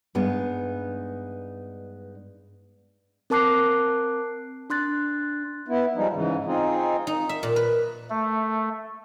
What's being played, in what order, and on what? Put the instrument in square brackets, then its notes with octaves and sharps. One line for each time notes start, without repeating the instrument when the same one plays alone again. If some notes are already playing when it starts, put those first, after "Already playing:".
[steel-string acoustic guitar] G2 G#3 B3 D#4
[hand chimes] C4 A#4 A5 D6 F#6 C7
D4 C6 F#6 A6
[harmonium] B3 E4
F3 G3 G#3 D#4
G#2 C#3 E3
C4 D#4 F4 G#4
[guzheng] D#4
E5
A#2
B4
[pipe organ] A3